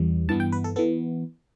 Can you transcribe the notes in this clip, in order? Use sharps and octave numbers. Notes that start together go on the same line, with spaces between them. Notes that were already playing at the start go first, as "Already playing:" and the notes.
Already playing: E2 E3 G3
G2 E3 B3 A5
G5
B4
A4
E3 B3 A4